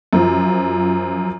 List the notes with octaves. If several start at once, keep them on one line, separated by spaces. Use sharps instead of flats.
F#2 F3